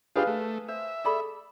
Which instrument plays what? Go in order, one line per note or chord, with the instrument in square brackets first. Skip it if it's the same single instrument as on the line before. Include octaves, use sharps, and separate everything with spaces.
[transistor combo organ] D4 F4 G4 [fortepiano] G#4 B4 F5
[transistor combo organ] A3
[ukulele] C5 [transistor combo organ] E5
[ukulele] G#4 A4 B5 [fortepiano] D5